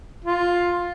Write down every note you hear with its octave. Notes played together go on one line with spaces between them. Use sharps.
F4